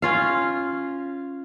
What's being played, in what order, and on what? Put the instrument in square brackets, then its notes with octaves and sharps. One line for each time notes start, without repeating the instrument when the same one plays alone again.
[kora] C#4 F4 F5